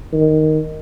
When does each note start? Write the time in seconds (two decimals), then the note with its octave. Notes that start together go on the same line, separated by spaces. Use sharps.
0.13 D#3